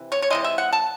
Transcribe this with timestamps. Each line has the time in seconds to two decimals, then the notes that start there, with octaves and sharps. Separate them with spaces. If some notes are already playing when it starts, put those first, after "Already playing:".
Already playing: C3 E3
0.12 C#5
0.22 C#5
0.30 C3 E3 G#3 D#5
0.44 E5
0.58 F#5
0.73 A5